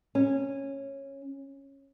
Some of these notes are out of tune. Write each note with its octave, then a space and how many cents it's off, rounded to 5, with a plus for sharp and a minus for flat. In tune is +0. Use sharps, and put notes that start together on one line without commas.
C#4 -15